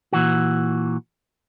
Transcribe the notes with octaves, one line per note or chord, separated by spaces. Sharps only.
A#2 E3 F#4